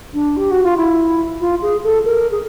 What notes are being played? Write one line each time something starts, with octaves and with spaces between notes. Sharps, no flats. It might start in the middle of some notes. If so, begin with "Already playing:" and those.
D4
G4
F#4
F4
E4
F4
G#4
A4
A#4
G#4